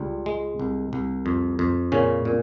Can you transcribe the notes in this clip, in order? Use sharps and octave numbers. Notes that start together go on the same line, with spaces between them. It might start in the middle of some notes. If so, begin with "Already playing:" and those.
Already playing: C#2 G3
G#3
C2
C2
F2
F2
A#2 C#3 C#4
A#2